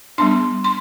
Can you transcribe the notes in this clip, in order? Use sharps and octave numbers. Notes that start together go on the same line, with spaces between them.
G3 B3 D4 C6
C6